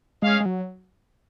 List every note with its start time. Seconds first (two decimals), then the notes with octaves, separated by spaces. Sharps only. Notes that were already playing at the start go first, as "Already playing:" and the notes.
0.22 G#3 C#4 G#4 C#5 F5
0.40 G#3
0.45 F#3